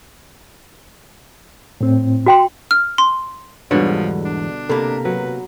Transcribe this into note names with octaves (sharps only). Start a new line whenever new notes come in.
A2 C4
F#4 G5 C6
F6
C6
E2 G#2 B2 D3 F3 G3 B4 C#5
D4
C3 A#3 A4 A#5 B5
F#3 B4